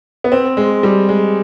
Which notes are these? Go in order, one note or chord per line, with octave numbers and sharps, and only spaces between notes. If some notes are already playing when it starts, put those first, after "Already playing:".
B3
C4
G#3
G3
G#3